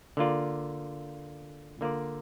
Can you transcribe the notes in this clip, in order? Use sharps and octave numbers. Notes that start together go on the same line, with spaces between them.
D3 A#3 F4 D5
D3 A#3 F4 D5